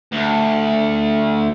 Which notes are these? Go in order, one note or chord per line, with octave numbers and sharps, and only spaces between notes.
D2